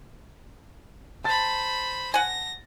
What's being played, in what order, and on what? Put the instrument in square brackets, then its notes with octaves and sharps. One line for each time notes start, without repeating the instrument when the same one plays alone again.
[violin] C5 B5 [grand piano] A5 A6
[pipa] F#5 G#5 [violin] A#6